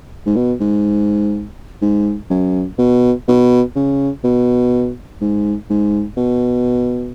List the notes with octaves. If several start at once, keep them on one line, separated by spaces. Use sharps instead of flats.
G#2
B2
G#2
G#2
F#2
B2
B2
C#3
B2
G#2
G#2
B2